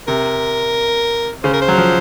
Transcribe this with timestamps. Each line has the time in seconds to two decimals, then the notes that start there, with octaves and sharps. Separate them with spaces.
0.08 C3 A#4
1.44 C#3 C5
1.53 A#4
1.61 C5
1.68 F#3
1.78 F3